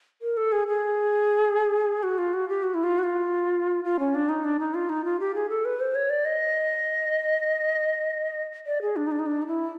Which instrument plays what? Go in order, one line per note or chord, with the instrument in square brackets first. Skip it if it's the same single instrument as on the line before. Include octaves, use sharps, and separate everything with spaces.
[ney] A#4
A4
G#4
G#4
F#4
F4
F#4
G4
F#4
E4
F4
F#4
F4
F4
C#4
D4
D#4
D4
D#4
F4
D#4
F4
G4
G#4
A4
B4
C5
C#5
D5
D#5
D5
G#4
D4
D#4
D4
D#4
D4
D#4
E4